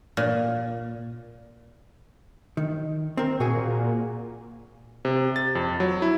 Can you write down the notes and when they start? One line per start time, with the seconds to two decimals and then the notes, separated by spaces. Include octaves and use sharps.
0.17 A#2
2.57 D#3
3.17 C4 A#4
3.40 A#2 F#4 G#4
5.05 C3
5.36 A6
5.55 F2
5.80 F#3
6.02 E4